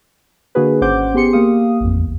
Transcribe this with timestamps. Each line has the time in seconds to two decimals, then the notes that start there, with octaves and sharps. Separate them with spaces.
0.55 D3 A#3 D4 F#4 G#4 B4
0.81 G#1 C#4 C5 F#5 D6 G6
1.14 B3 G4 G#4 C6 C#7
1.33 A#3 G4 F5 D#6
1.81 A1 F2
1.97 G1 E2